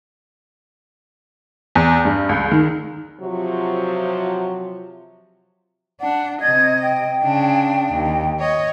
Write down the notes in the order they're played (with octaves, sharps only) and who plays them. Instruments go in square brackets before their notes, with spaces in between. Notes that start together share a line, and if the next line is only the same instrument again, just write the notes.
[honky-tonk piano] E2
G2
C#2
D#3
[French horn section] C3 F3 F#3
[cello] D4 [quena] F#5
[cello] C3 D#5 [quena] G#6
[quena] G5
[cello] C#3 D4
D#2
C#5 D#5